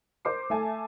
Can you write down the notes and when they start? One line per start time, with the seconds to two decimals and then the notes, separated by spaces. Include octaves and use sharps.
0.25 A#4 C5 D6 C7
0.50 A3 E5 G#5 A5